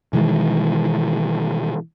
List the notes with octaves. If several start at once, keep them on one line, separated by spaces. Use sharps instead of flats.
B2 D#3 E3 G#3